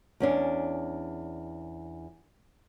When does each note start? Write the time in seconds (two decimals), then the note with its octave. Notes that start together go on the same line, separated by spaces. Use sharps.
0.20 E2 C#4 D4